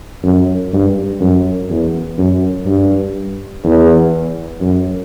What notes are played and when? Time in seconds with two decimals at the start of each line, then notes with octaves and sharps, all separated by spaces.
0.23 F#2
0.73 G2
1.21 F#2
1.69 E2
2.18 F#2
2.66 G2
3.64 E2
4.61 F#2